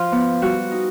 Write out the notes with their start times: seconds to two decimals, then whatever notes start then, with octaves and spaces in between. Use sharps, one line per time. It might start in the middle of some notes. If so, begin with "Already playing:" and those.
Already playing: F3 F4
0.12 B3
0.42 G3 F#4
0.71 D#4